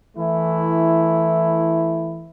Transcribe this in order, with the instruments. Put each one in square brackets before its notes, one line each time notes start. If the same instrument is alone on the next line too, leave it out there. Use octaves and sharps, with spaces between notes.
[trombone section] E3 A3 E4